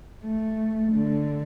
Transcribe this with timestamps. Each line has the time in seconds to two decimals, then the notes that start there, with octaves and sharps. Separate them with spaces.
0.24 A3
0.93 D3